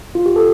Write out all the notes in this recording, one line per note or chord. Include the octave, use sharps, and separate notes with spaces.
F4
G4
A4